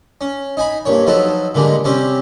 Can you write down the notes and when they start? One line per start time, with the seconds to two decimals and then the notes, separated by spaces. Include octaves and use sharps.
0.21 C#4
0.57 D#4 G#5 B5
0.85 G2 A#2 C#5
1.06 F3 F#3 D#4 A4 B4
1.55 A#2 D3 G3 G#3
1.84 C3 G3 C4 C#4 G4